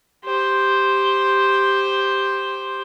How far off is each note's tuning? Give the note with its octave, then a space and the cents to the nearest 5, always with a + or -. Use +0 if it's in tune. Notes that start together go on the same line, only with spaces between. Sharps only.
G4 +0 C5 +0